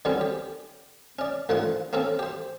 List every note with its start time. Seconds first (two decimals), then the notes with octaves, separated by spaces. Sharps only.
0.05 D3 D#3 G3 C4 C#4
0.21 G4
1.19 C#4 D5
1.49 A1 D3 D#3 F3 F#5
1.93 A#3 C4 C#4 A4
2.19 G4 C5